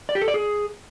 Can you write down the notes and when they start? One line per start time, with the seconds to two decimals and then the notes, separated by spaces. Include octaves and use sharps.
0.09 D5
0.15 G4
0.22 A4
0.28 D5
0.34 G#4